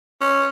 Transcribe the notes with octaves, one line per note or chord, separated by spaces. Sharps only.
C#4